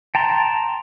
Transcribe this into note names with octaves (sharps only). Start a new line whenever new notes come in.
G5 A5 A#5 C6